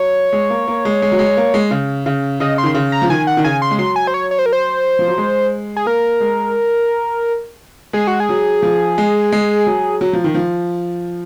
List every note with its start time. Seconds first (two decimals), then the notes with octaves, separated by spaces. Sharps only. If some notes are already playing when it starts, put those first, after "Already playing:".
Already playing: F#3 C#5
0.33 G#3
0.50 A#3
0.68 A#3
0.85 G#3
1.02 G#3
1.12 F#3
1.19 G#3
1.37 A#3
1.54 G#3
1.71 C#3
2.06 C#3
2.40 C#3 D#5
2.58 C6
2.63 D#3
2.75 C#3
2.92 A#5
3.02 F3
3.09 D#3 G#5
3.27 F#5
3.37 D#3
3.44 C#3 G#5
3.62 C6
3.71 G#3
3.78 F#3 C6
3.96 G#5
4.07 C5
4.14 C#5
4.31 C#5
4.39 C5
4.46 A#4
4.53 C5
4.99 F3
5.08 F#3
5.18 G#3
5.76 G#4
5.86 A#3 A#4
6.21 G#3
7.93 G#3 G#4
8.07 F#4
8.20 G#4
8.29 F#3
8.62 F3
8.98 G#3
9.32 G#3
9.67 F#3
10.01 F#3
10.13 F3
10.24 D#3
10.34 F3